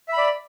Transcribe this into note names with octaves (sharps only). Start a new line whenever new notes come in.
D5 E5 B5